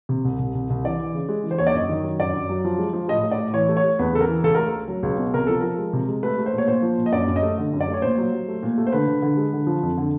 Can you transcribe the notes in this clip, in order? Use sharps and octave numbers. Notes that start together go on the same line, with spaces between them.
C3
C2
C2
C2
C2
E3 D5
E3
C#3
G#3
E3
C5
D#2 C#5
D5
F#2 D#5
D#3
F#3
F#2 D5
F#2
F#3
F3
G#3
F3
A2 D#5
A2
D5
A2
E3 C#5
A3
C#5
A3
E2 B4
C#3 A4
A#4
E3
C#2 A4
A3 A#4
A4
A3
F#3
C#2
B2
C3 A#4
F3 A4
F3 A#4
G#3
C3
G#3
A3 B4
A3
C5
A#2 C#5
A#2 C5
F3
A#2
D#5
F#2 D5
F#2
D#5
A3
D3
F#2
D5
A3
C#5
A#2 C5
F#3
F#3
A3
A#2
A3
C5
D3 B4
D3
D3
G#3
D3
F3
F2
D3